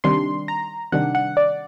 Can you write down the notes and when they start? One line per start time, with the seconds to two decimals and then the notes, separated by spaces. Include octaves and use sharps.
0.04 C3 D#3 G3 D4 C6
0.48 A#5
0.92 C3 D#3 G3 D4 F#5
1.15 F#5
1.37 D5